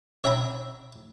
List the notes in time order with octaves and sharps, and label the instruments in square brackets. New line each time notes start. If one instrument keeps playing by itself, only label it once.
[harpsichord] C#5 E5 G5 A#5 B5